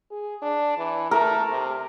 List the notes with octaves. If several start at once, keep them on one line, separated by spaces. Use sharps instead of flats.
G#4
D4
E3
A3 A#4
C3